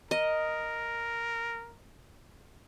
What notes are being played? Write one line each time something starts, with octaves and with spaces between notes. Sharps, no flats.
A#4 D#5